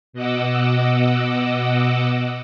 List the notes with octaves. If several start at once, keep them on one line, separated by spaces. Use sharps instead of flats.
B2 D#5 F#5 D6 E6